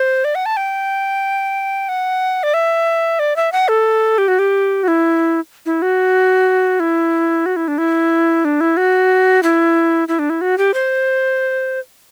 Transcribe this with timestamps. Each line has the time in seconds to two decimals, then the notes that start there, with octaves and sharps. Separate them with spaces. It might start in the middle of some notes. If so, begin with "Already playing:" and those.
Already playing: C5
0.24 D5
0.35 F#5
0.46 A5
0.57 G5
1.89 F#5
2.43 D5
2.54 E5
3.19 D5
3.36 E5
3.52 F#5
3.68 A4
4.18 G4
4.28 F#4
4.39 G4
4.83 F#4
4.88 E4
5.66 E4
5.82 F#4
6.80 E4
7.46 F#4
7.56 E4
7.68 D4
7.78 E4
8.45 D4
8.61 E4
8.77 F#4
9.43 E4
10.08 E4
10.19 D4
10.30 E4
10.41 F#4
10.58 G4
10.74 C5